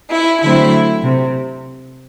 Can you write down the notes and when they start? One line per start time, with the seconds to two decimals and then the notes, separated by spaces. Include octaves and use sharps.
0.13 E4
0.43 D3 F#3 A3 C4 E4
1.02 C3